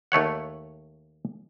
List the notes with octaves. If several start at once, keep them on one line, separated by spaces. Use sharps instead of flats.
D#2 A3 C#5 F#5